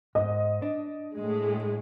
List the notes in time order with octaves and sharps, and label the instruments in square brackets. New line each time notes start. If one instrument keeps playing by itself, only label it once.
[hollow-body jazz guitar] G#2 [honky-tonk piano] D#5
[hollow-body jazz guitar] D4
[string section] A2 G#3